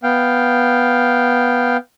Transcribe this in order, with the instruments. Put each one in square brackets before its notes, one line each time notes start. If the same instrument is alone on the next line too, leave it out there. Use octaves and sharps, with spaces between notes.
[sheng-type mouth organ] B3 F5 G5